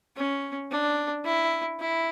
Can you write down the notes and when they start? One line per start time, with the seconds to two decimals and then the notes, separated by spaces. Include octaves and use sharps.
0.16 C#4
0.71 D4
1.25 E4
1.80 E4